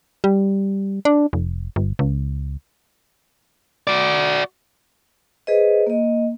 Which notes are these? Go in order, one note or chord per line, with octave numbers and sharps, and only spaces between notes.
G3
D4
F1
G1
C#2
F#4 D5
G#4 B4 C5 D#5
A#3 D#5